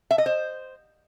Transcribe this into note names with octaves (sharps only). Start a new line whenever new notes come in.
E5
D#5
C5